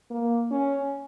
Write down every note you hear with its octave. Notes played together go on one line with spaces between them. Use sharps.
A#3
C#4